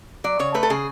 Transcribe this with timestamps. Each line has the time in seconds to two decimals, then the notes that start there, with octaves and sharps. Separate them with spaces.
0.24 F#3 D5
0.39 C#3 C#5
0.54 A3 B4
0.63 A4
0.70 C#3 G#4